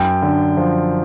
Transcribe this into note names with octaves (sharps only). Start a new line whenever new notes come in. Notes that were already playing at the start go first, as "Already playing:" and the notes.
Already playing: F#2 G5
D3
F3